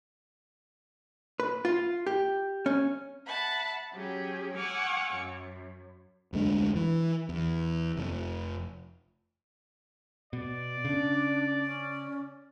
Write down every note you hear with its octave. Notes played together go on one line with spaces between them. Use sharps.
B4
F4
G4
C#4
E5 F#5 A5 B5
F#3 C#4 G4 G#4
F#5 G#5 C#6 D6 E6 F6
F#2
F1 D2 G#3 D4
E3
E2
F1
B2 D5
C#3 D4
C#4